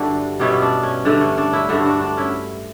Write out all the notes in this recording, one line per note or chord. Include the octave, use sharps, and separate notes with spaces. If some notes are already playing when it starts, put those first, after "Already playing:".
Already playing: G2 D3 G3 D4 E4 F#4
B2 G3 B3 C#4 E4
D4
C#4
G2 D3 A3 D4
C#4
D4
C#4 E4
G2 D3 A3 D4 F#4
D4 F#4
D4
C#4 E4